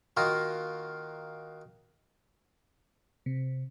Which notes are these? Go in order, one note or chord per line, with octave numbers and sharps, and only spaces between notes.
D#3 A#3 F4 F#4 A#4 D#5
C3